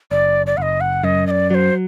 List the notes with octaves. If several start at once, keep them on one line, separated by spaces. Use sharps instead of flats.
F#1 D5
D5
F#1 D#5 F#5
F#5
F#2 D#5
D#5
D5
F#3 C5 D5